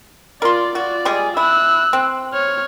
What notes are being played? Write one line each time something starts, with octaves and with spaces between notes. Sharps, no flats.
F4 A#4 D5 C6
F4 F#4 D5
G3 G#3 G#4
E4 E6 F#6
C4
C#5 F6